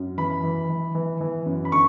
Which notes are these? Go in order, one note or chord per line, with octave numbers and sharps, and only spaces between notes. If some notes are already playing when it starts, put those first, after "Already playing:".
Already playing: F#2
E3 B5
E3
E3
E3
E3
F#2
B5
D3 C#6